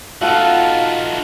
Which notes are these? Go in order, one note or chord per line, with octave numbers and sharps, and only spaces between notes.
A3 D#4 F4 F#4 A4 F#5